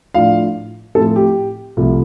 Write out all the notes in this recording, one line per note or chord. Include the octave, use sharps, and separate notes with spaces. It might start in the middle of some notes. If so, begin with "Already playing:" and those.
A2 F3 D4 F4 F5
A2 F3 C4 F4 A4
G4
C2 C3 F3 A3